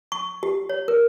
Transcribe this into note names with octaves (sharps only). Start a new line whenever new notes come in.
C#6
G4
C#5
A#4